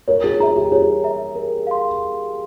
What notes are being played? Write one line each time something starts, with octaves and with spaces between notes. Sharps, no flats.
A#4 C#5
G#4
G#4 E5 A#5
G4
G#4 C#5
E5 A#5
A#4
F5 C6